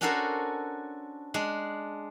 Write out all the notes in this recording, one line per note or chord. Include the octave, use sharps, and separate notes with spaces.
C#4 D4 F#4 A4 A#4 C5
G#3 D4